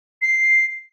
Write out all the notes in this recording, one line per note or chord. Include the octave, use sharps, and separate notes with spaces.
C7